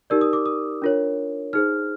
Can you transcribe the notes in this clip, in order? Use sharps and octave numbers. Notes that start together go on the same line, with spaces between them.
D#4 G4 A#4 D5 E6
D#6
D6
D#6
D4 F4 A#4 C#5
D#4 G#4 C5 F6